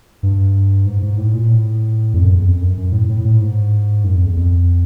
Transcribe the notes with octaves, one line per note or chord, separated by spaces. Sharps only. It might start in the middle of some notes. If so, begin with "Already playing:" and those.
G2
G#2
G#2
A2
A#2
A2
F2
F#2
E2
F2
F#2
F#2
A2
A2
A2
G#2
F#2
F2
E2
F2